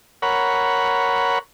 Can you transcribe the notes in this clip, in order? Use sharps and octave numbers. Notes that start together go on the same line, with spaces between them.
A#4 C#5 F#5 B5